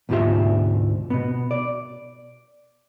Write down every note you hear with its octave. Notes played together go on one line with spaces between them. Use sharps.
D2 G#2 B2 F4 G4 E5
B2 B3
D5